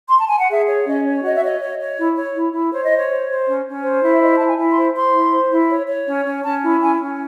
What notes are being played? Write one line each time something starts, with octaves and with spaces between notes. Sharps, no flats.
C6
A5
G#5
F#5
G#4 E5
C#5
C#4 D#5
C#5
F#4 D#5
E5
C#5 D#5
C#5
C#5
E4
C#5
E4
E4
C5 C#5
D#5
C5
C#5
C5
C5
C#4
C#4
C5
E4
E5
C5 D#5
E4 A5
G#5
E4
C6
C5
C5 C6
E4
C5
E4
C#5
C#5
C#4
C#4
C#4 A5
E4
C#4 G#5
C#4